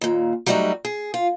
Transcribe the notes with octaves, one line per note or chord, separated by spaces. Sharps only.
D#2 A#2
F#3 G3 A3 B3 D#4 F#4
G#4
F4